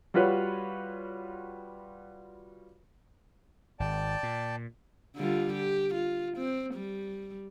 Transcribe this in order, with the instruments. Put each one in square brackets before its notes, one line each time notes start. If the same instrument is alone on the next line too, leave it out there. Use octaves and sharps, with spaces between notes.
[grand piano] G3 F4 F#4 B4 C#5
[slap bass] G#1 [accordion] D5 G5 A5
[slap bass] A#2
[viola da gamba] D3 G3 F4
G4
F4
C4
G3